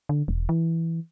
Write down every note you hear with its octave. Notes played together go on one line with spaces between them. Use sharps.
D3
E1
E3